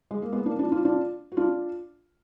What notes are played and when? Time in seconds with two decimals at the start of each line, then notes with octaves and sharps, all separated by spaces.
0.11 G#3
0.22 A#3
0.32 G#3 B3
0.46 A#3 D4
0.59 D4 F4
0.72 D4 F4
0.85 D4 F4
1.32 F#4
1.37 D4 F4